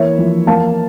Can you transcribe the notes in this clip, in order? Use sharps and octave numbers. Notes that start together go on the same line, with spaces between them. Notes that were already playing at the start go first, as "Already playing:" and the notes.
Already playing: E3 A#3 C#5 E5
F3
A#3 F5 A5